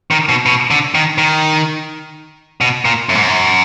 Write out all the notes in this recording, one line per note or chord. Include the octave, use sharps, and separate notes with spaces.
D#3
B2
B2
D3
D#3
D#3
B2
A#2
F#2
G#2
F#2